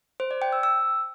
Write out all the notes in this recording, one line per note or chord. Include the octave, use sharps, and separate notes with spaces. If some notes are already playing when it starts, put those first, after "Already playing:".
C5
D5
G5
E6
E6